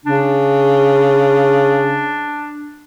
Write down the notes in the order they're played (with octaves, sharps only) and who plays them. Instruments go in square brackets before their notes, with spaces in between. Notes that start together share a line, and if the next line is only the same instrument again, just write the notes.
[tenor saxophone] C#3 [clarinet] D4